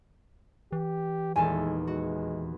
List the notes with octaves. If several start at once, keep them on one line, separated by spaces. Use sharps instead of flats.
E3 G4
D#1 E2 G#3 A4 G#5
G#3 F#4